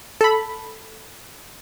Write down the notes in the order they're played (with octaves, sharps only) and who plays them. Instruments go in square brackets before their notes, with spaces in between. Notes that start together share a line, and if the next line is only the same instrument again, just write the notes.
[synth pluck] A4 B5